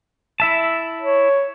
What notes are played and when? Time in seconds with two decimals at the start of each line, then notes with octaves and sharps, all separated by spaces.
0.40 E4 E5 A5
1.02 C#5